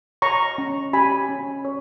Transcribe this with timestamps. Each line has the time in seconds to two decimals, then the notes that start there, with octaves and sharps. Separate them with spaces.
0.22 C#5 A#5 C#6
0.58 C#4
0.93 G4 G#5 B5
1.29 C#4
1.65 C#5